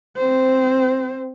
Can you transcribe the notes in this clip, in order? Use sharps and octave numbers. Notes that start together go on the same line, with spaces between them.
C4 C5